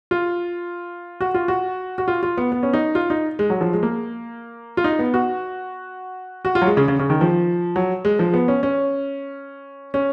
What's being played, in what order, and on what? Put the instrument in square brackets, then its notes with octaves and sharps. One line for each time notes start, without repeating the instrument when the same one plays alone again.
[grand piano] F4
F#4
F4
F#4
F#4
F4
F4
B3
B3
C#4
D#4
F4
D#4
G#3
F#3
F3
G#3
A#3
F4
D#4
B3
F#4
F#4
F4
F#3
G#3
C#3
C#3
C#3
D#3
F3
F#3
G#3
F3
B3
C#4
C#4
C#4